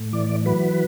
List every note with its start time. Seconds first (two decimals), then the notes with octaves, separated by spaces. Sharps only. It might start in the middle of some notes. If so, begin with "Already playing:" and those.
Already playing: A2
0.13 E3 D5
0.46 F#3 B4